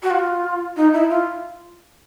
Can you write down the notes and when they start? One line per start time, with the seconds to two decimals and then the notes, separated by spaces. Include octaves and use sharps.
0.03 F#4
0.11 F4
0.77 D#4
0.93 E4
1.09 F4